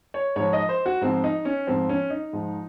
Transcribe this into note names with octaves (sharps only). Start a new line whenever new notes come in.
C#5
G#2 F3 C#5
D#5
C5
F#4
G#2 F3 C4
D#4
C#4
G#2 F3 C4
C#4
D#4
G#2 F3